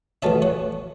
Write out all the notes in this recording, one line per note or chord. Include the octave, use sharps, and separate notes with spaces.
E2 B2 A3 C#4 E5 A5
C#5 F#5